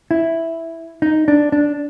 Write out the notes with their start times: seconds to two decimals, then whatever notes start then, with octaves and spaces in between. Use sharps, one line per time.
0.11 E4
1.02 D#4
1.28 D4
1.52 D4